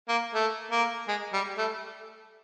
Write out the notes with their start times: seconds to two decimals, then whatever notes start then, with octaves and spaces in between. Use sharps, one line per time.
0.09 A#3
0.35 A3
0.72 A#3
1.08 G#3
1.33 G3
1.58 A3